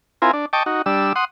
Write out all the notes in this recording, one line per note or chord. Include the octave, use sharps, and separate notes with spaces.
C4 E4 F4 A#4 G#5
D4
D#5 G5 A5 C#6 D6
D#4 F#4
G3 D4 E6
F#5 C6 D#6